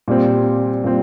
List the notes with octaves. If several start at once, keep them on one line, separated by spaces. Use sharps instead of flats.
A#2 G3 C4
A#2 G3 C4